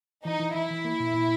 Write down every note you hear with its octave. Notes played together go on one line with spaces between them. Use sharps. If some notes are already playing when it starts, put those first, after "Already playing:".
E3 D#4
E3
E3 E4
E3
A#3
A#2
A#2